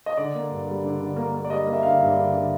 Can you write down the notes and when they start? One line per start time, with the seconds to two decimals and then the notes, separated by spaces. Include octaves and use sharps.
0.06 D#5
0.17 D3 D5
0.35 A#3
0.51 G2
0.67 G3
0.83 D3
1.00 D3
1.16 A#3
1.34 A#3
1.45 D5
1.50 G3 D#5
1.67 A#3
1.73 E5
1.83 D3 F5
2.00 G2
2.17 D3
2.33 D3